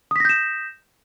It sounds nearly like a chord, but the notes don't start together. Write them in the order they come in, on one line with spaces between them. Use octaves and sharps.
D#6 B6 A#6 G6 E7